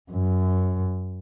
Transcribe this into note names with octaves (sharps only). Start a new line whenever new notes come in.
F#2